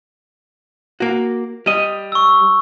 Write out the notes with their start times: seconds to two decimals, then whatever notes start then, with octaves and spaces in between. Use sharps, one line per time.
1.00 A#3 F#4
1.66 G3 D#5
2.12 C#6 E6